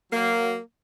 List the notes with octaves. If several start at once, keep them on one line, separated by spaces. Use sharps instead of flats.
F#3 A#3